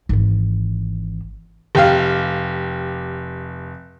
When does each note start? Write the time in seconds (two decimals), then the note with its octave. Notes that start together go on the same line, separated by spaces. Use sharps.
0.09 G#1 E3
1.75 F1 G4 F5